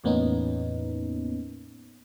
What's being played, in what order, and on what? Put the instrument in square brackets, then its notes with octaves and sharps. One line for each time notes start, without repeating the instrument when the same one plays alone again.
[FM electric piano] E2 A2 A#3 B3 C#4 D#4